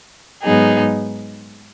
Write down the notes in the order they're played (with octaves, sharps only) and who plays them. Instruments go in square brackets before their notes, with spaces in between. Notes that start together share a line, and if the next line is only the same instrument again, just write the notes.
[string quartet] G#2 F#3 B3 D#4 G#4